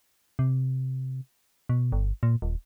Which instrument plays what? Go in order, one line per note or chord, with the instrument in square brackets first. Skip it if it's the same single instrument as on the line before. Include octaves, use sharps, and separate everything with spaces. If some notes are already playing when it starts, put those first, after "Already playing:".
[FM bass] C3
B2
G1
A#2
D#1